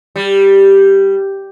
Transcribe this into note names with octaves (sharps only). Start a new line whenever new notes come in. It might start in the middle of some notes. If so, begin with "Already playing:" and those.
G3